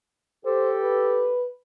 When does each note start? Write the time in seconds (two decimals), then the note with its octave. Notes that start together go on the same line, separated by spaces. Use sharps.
0.45 G4 A4 C5
0.82 B4